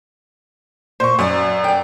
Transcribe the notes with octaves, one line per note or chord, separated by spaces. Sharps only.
A#2 C5 C#6
F#2 D5 F#5
D5 G5